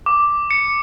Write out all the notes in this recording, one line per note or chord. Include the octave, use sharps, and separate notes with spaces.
D6
C#7